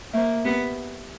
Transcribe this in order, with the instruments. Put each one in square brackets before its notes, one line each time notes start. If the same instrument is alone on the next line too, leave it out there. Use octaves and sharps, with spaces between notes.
[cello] A#3 [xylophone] C5 E5
[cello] B3 [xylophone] G4